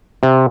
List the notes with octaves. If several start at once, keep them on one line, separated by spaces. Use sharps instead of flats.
C3